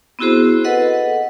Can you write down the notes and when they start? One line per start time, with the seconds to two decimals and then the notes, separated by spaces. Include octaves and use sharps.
0.19 B3 C4 E4 F#4 G#4 C5
0.65 A4 B4 D#5 F#5